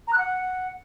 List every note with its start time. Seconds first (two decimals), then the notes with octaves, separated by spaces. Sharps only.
0.07 A#5
0.13 F#6
0.18 F#5